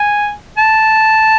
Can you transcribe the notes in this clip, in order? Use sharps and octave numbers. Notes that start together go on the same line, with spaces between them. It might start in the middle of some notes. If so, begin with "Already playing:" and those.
Already playing: G#5
A5